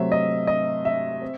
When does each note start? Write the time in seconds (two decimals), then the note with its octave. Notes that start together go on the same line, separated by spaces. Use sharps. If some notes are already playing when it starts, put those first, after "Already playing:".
Already playing: C3 F#3 A3 C4 E5
0.12 D#5
0.47 D#5
0.85 E5
1.22 C4